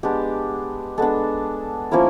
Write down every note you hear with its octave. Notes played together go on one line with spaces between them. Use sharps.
G#3 B3 D4 G4
G#3 B3 D4 A4
F3 A#3 C#4 E4 A#4